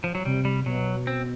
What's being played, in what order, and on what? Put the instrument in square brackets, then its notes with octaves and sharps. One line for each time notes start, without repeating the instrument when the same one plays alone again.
[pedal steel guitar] F3
F#3
[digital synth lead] C3 [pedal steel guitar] G3
[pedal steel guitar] G3
[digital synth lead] B2 [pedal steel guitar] F#3
[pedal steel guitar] C4